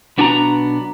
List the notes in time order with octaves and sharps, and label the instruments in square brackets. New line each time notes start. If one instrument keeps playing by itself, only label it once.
[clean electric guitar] B1 B3 D4 F#4 G#5 A#5